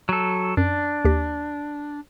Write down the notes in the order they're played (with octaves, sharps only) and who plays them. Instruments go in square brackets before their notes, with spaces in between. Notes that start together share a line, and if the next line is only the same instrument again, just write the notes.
[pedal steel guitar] F#3 A4
[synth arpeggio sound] F#2 [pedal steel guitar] D4
[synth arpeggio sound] D#2 G4